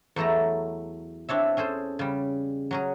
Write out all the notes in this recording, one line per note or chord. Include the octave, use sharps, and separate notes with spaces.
E2 F#3 A3 A4 A#5
C4 D4 C#5 E5
C#4 G#4 A4 C5
C#3 G3
F#3 C#4 G#4